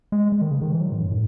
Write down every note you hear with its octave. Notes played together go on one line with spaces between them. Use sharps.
G#3
G#3
D#3
C#3
D#3
E3
F#3
G#2
F#2
A2